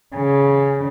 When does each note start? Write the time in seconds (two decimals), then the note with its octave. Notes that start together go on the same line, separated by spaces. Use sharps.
0.15 C#3